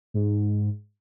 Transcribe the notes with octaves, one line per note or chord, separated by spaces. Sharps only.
G#2